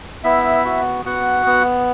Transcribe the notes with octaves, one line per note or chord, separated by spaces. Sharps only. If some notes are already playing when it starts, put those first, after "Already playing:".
B3 E4 E5
F#4
B3 F#4 F#5
B3